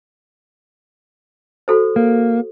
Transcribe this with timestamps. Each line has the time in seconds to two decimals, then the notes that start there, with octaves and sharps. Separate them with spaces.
1.68 F#4 A4 C5
1.96 A#3